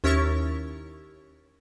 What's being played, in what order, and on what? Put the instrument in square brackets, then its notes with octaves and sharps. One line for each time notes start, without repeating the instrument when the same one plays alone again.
[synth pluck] D#2 C#4 E4 A#4 C#6 A6